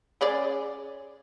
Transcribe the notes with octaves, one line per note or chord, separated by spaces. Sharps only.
C#4 G#4 D5